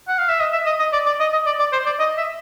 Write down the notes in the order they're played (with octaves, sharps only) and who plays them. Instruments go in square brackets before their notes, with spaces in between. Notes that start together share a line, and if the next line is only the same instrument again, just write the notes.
[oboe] F#5
F5
E5
D#5
E5
D#5
D#5
D5
D5
D#5
D#5
D5
D5
C5
D5
D#5
E5